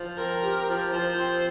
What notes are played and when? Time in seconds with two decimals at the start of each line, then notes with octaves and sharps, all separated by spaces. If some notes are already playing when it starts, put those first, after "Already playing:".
Already playing: F3
0.17 C4 A#4
0.42 G4
0.68 F3
0.93 F3 C5
1.18 C4